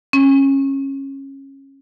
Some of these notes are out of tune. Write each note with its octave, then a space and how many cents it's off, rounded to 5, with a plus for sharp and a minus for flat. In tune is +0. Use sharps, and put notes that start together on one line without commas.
C#4 -20